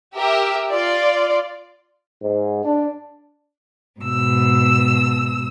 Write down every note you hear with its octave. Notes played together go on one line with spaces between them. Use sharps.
G4 A#4 E5
F4 D5
G#2
D4
G#2 B2 E6